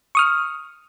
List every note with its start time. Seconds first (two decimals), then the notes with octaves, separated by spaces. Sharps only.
0.15 C#6 D#6 F6